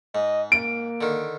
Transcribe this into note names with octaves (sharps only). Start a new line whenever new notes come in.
G#2 D#5
A#3 D7
D3 D#3